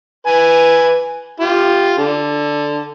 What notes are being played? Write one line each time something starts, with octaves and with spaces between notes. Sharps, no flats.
B4 G#5
F4 G4
D3